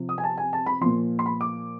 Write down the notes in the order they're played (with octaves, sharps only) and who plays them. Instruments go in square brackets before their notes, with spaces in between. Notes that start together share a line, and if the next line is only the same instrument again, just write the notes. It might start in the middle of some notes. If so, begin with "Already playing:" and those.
Already playing: [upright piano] C3 F3
D#6
G#5
A5
G#5
A5
B5
A#2 F3 C6
C6
B5
D6